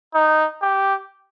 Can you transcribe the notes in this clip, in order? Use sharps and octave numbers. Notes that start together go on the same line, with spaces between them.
D#4
G4